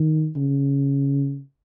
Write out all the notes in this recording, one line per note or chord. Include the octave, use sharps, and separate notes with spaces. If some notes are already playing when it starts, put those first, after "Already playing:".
Already playing: D#3
C#3